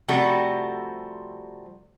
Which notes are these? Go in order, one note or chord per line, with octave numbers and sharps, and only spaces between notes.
C3 F3 G3 A3 F#4 A4